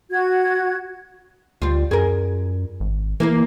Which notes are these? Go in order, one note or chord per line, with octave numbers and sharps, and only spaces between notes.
F#4 G#6
D2 G3 F4
F#2 G#4 A#4
G#1
E3 A#3 E4 A#4